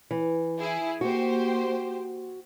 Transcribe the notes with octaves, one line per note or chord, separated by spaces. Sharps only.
E3
E4 G#4
A#3 F#4 G4 C5